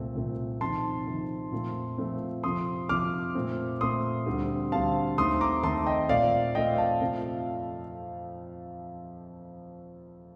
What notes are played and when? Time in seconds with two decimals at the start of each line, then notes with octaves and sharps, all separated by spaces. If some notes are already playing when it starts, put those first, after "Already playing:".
Already playing: C2 A#2 A3 C4
0.15 C2 A#2 A3 C4
0.60 F2 C3 D#3 A5 C6
1.07 F2 C3 D#3
1.52 A#2 F3 A3 C4
1.98 A#2 F3 A3 C4
2.43 F2 C3 F3 C6 D#6
2.89 F2 C3 F3 D6 F6
3.35 A#2 A3 C4
3.81 A#2 A3 C4 C6 D#6
4.26 D2 D3 G3 C4
4.72 D2 D3 G3 C4 F5 A5
5.18 D#2 D#3 A3 C4 C6 D#6
5.41 A#5 D6
5.63 D#2 D#3 A3 C4 A5 C6
5.86 D#5 G5
6.09 A#2 A3 C4 D5 F5
6.55 A#2 A3 C4 D#5 G5
6.78 F5 A5
7.01 F2 C3 F3 A3